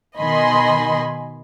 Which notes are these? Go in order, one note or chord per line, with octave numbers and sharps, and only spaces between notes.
B2 D#3 D#5 G#5 B5 C6